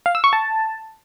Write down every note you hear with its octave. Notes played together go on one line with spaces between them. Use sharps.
F5
E6
C#6
A5